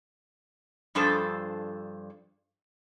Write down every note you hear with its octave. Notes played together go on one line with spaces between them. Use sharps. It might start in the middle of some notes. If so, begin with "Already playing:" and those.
G2 F3 D4 G#4 A4 C5